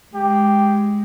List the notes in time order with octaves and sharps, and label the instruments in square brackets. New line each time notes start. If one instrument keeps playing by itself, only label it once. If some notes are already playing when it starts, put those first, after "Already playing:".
[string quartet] G#3 [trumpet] G4